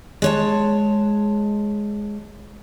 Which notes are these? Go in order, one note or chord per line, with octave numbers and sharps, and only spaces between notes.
G#3 C#5 A5